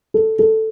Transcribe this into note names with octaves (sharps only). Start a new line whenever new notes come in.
A4
A4